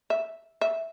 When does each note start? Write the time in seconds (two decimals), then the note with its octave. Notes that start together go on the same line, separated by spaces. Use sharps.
0.10 E5
0.61 E5